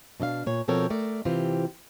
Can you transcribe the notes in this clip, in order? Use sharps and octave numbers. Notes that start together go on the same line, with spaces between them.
B2 D4 D#5 F5
A#2 C#5
B2 F3 C4 A4 A#4 C#5
A3 A#4 D5
C3 E3 C4 F4 G4